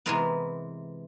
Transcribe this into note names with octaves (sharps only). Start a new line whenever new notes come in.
C3 E3 G#3 B3 A#4